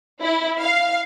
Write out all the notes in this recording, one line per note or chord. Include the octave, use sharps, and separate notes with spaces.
E4
F5